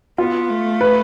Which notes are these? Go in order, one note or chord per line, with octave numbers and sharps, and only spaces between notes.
B3 F4
A3
B4